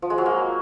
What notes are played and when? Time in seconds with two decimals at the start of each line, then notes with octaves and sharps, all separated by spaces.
0.02 F3
0.10 G#3
0.18 F#3
0.26 A#3